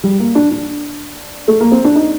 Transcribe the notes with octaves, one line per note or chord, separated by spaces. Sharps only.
G3
A#3
D4
D4
A3
A#3
C4
D4
D#4